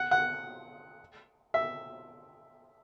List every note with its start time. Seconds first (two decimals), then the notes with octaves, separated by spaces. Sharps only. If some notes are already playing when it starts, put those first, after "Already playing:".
Already playing: F#5
0.11 F#5
1.54 E5